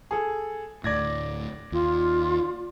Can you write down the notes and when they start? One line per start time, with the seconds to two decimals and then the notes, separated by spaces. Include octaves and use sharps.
0.11 G#4 A4
0.84 D2 A2 D5 G#6 A#6
1.72 D#2 F4